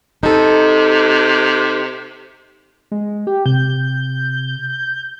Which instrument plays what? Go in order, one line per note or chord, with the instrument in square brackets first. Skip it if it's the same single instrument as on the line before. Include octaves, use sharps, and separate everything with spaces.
[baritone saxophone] C3 [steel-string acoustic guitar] D#4 A4
[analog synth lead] G#3
G4
[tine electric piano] C3 [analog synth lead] G6